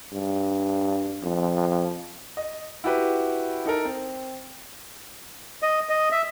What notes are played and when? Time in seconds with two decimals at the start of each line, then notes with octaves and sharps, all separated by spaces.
0.12 G2
1.23 F2
2.37 D#5
2.84 E4 F#4 G4 B4
3.66 D#4 A4 A#4
3.85 C4
5.63 D#5
5.89 D#5
6.12 E5